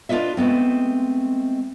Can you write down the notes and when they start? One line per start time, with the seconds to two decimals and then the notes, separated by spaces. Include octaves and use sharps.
0.09 D4 F4 G4 B4 D#5 E5
0.37 G#3 A3 B3 C4